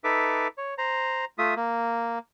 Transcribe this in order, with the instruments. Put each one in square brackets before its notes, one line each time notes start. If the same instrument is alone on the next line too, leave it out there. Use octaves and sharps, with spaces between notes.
[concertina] D#4 A4 B4 E5 D6
C#5
C5 A#5
A3 F4 E5 D#6
A#3